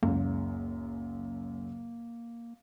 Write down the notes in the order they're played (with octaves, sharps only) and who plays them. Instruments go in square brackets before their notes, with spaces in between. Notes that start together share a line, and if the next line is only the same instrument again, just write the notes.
[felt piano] F#1 C#2 F#2 [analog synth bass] A#3